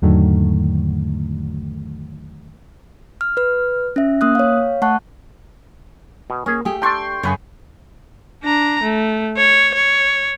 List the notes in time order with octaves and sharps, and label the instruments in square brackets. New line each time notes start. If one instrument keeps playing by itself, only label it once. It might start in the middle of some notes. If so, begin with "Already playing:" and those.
[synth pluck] E2 G#2 D3 D#3 F#3 A3
[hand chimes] F6
B4 F6
C#4 E5
A#3 D#6 F#6
C#5 F5
A3 F#5 A5 C#6 F#6
[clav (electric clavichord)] B2
[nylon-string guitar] A#3 [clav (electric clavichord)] C#4 G#4
[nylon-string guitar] A3 G4 [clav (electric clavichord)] G#4
[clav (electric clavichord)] D4 A4 [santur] G5 C6 C#6
[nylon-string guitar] F#2 C#3 [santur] G#4 B4 C#5
[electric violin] D4 A#5
A3
C#5
C#5